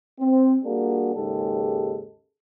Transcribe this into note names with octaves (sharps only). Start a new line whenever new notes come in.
C4
G3 A#3 D4 F#4 G#4
D#2 G#2 C#3 G#3 G4 A4